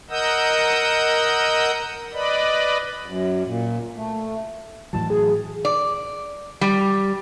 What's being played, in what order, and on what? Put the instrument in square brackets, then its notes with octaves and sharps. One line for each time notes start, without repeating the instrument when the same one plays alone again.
[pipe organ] A#4 D#5 F#5 D#6 E6 G6
B4 D5 D#5 B5
[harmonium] F#2
A#2
A3
[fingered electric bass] A2 E3 F#3 [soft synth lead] A5
[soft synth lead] G#4
[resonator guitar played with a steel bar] D5
G3